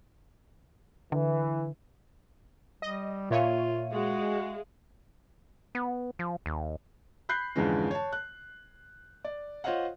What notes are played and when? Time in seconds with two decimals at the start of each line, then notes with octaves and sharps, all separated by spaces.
1.12 D3 E3
2.82 G3 D#5
3.31 A#2 F4 C#5 E5 F5 D#7
3.92 G#3 F#4
5.75 B3
6.19 F3
6.46 D#2
7.29 B5 F#6 G6 C7
7.56 F2 G#2 D3 E3 G#3 C#4
7.91 C#5 A5
8.12 F#6
9.24 D5
9.64 F4 C5 C#5 D#5 F5 F#5